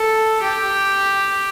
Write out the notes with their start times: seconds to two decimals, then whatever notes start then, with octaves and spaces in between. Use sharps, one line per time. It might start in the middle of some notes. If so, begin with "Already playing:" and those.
Already playing: A4
0.42 G4